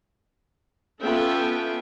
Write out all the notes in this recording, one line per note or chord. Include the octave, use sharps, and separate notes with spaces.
B3 C#4 F4 A4 E5 G5